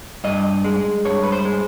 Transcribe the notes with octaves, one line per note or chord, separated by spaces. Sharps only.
G2 D#5
G#3
G2 C#5
B4
C5
G#3